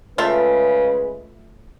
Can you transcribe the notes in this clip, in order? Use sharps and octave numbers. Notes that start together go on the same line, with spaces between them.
C#3 G#3 A3 F4 B4 E5